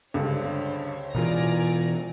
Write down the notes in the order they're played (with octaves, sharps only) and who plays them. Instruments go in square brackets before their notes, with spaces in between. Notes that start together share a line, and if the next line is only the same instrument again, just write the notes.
[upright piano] C#2 G2 D3 [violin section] C5 C#5
[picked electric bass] B2 E3 [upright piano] F4 A#4 [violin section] D5 G#5 A#5